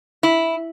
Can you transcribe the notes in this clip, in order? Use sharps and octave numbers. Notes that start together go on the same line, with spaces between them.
E4